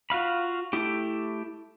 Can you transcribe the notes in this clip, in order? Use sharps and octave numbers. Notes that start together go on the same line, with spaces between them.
F4 F#4 F5 B5
A3 E4 G4